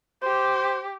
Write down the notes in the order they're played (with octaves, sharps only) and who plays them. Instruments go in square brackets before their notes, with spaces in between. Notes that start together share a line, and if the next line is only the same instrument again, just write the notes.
[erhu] G4 [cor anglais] C5